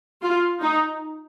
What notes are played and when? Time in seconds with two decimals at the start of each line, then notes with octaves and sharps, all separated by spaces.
0.22 F4
0.61 D#4